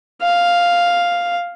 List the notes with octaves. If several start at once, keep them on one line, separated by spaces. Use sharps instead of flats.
F5